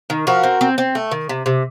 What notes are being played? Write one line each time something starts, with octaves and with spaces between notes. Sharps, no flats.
D#3
F3 F#4 A#4
C4
C4
C4
A3
D#3
C3
C3